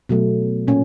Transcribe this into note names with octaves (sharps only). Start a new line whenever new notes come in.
B2 F#3 A3
A#2 C#4